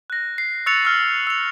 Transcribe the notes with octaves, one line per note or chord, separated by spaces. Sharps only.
F#6 A#6
C7
C#6 E6 F#6 A6 C#7 F7
E6 F6
E6 F7